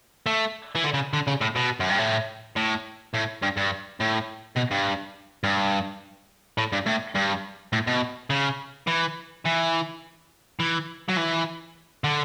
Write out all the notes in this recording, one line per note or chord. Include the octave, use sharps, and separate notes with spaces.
A3
E3
D3
C#3
D3
C#3
A2
B2
F#2
G2
A2
A2
A2
G2
G2
A2
B2
G2
G2
A2
G2
A2
G2
A2
B2
C#3
E3
E3
E3
F#3
E3
D3